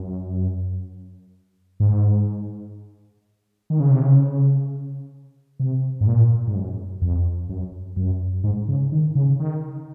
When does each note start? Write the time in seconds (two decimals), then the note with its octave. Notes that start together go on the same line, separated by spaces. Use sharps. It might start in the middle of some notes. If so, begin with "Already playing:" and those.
Already playing: F#2
1.80 G#2
3.70 D#3
3.80 C#3
3.91 C3
4.01 C#3
5.60 C3
6.01 G#2
6.07 A#2
6.48 G#2
6.55 F#2
7.02 F2
7.49 F#2
7.96 F#2
8.44 G#2
8.68 C#3
8.92 D#3
9.15 C#3
9.40 D#3